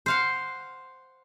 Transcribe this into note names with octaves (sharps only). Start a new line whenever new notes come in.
C5 F5 F#5